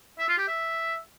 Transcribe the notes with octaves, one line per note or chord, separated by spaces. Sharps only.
E5
F4
G4
E5